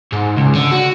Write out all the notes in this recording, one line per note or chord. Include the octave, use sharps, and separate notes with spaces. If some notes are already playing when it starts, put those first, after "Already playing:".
G#2
C#2
D3
F#4